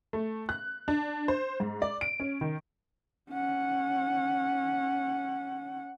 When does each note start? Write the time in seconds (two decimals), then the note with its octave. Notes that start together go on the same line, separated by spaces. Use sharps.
0.13 A3
0.49 F#6
0.88 D4
1.28 C5
1.60 G#2
1.82 D5
2.01 D7
2.20 C#4
2.41 D#3
3.31 C#4 F#5